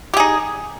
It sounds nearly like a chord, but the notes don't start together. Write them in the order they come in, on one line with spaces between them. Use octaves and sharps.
G4 G#4 D#4